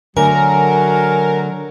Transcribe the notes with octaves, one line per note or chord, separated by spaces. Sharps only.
D3 F#3 A3 A#4 G#5